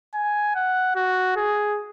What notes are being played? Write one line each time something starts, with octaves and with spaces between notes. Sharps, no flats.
G#5
F#5
F#4
G#4